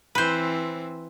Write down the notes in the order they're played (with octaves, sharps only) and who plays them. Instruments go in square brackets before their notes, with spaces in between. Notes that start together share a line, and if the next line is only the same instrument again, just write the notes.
[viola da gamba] E3 C4 [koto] B4 C5